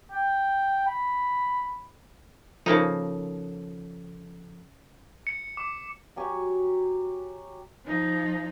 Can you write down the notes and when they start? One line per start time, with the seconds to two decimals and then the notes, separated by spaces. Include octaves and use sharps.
0.12 G5
0.87 B5
2.66 C#3 F3 A#3 D#4 A4
5.27 C#7
5.57 D6
6.16 F#3 F#4 G4 G#5
7.84 F3 D#4